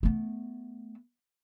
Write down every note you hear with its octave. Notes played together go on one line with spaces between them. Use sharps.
A3 B3